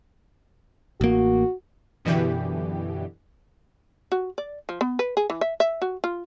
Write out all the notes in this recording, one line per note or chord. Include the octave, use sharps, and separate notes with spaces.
A1 A#3 F#4
F#2 B2 D3 E3 G4
F#4
D5
F3
B3
B4
G#4
E3
E5
E5
F#4
F4